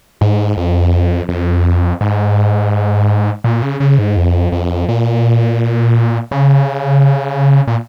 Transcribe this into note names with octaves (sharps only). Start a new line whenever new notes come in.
G#2
F2
F2
G#2
A#2
C#3
C#3
G#2
F2
F2
A#2
C#3
A#2